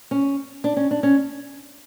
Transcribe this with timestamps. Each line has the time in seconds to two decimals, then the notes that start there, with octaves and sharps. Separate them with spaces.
0.11 C#4
0.64 D4
0.77 C#4
0.91 D4
1.03 C#4